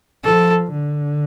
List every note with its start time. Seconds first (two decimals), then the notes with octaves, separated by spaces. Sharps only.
0.23 F3 A4
0.71 D3